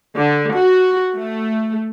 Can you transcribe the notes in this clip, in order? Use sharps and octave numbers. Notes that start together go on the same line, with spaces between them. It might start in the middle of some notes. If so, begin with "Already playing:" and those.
D3
F#4
A3